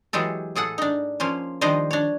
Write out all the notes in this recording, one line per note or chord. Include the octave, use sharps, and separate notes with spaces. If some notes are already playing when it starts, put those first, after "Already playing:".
E3 F#3 G#3 G4 A4
A2 G#4 A4 F#5
D4 D#4
F3 A#3 C#4 C5
D#3 F3 G3 D4 C5 D#5
D4 C#5